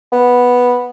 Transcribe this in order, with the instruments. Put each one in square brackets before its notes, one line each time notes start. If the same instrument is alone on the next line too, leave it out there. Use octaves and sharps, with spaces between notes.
[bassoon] B3